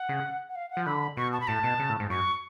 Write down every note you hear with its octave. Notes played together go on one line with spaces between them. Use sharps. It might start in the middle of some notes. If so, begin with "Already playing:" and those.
Already playing: F#5
C#3
F#5
F5
F#5
F3
D3 B5
B2 C#6
A5
B5
A2 A5
B2
C#3
A2
G#2
F#2 C#6